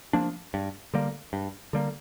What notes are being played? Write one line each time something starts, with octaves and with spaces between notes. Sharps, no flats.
F3 A#3 D4
G2
D3 G3 A#3
G2
D3 G3 A#3